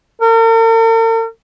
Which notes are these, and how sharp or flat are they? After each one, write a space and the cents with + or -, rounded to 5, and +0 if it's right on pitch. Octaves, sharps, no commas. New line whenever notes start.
A#4 -45